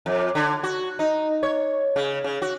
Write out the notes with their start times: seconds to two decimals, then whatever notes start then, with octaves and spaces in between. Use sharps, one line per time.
0.06 F2
0.35 D3
0.63 F#4
0.99 D#4
1.43 C#5
1.96 C#3
2.24 C#3
2.42 F#4